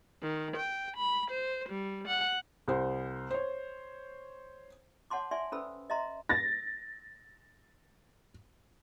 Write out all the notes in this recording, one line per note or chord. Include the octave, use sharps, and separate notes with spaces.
D#3
G5
B5
C5
G3
F#5
C2 C5
C5 C#5
C#5 F#5 A5 C6 D6
D5 E5 G#5 C6
C#4 A4 B4 C5 B5 E6
D#5 E5 A#5 C6
A6 A#6